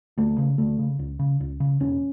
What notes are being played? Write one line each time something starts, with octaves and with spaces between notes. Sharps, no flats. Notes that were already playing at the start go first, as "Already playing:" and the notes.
D2 A3
C#3
D2 A3
C#3
C#2
C#3
C#2
C#3
E1 C#4